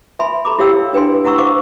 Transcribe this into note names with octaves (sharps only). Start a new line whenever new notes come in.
E5 G#5 B5 C6
A4 A#5 B5 D6
E4 G4 C#5 F5 G5 E6
D4 B4 G5 G#5 C6
E4 F#5 A#5 C#6 E6
C5 F5 F#5 C#6 D6